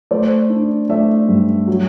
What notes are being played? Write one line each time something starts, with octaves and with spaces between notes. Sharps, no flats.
A3 C5 D5
D4
A3 D5 E5
G2
F#3